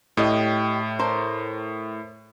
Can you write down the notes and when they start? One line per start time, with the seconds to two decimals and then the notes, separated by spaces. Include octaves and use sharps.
0.17 A2 G4 D#5
0.99 A#4 C5